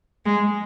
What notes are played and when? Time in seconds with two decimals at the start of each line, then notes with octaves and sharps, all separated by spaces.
0.25 G#3